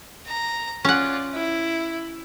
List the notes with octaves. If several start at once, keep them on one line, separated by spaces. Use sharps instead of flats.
A#5
C#4 F4 D5 F#5
E4